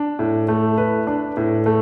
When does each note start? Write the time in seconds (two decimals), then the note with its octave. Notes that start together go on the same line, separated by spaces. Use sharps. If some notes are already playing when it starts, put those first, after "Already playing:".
Already playing: D4
0.19 A2
0.48 A3
0.78 B4
1.07 D4
1.37 A2
1.66 A3